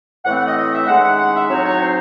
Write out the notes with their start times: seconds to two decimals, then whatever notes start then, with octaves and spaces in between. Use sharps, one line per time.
0.24 A2 E3 A3 C4 F#5
0.35 F#5
0.45 D#5
0.56 D#5
0.71 E5
0.86 D#3 G#3 C#4 F#5
1.02 F#5
1.17 F#5
1.33 E5
1.48 A2 F#3 C4 D#4 C#5
1.64 C#5
1.79 C5